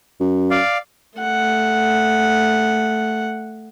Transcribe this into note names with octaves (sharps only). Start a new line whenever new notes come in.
F#2
D5 F5
A3 F#5